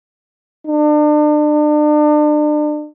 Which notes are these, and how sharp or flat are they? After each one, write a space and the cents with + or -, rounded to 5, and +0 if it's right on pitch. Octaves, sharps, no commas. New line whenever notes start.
D4 +35